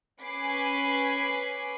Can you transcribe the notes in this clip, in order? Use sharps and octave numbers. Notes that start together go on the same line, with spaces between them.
C#4 B4 G#5 B5 D6 C7